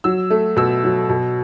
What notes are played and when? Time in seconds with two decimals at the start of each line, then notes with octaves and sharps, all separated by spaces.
0.04 F#3 E6
0.30 A3
0.56 B2 E6
0.84 F#3
1.09 B2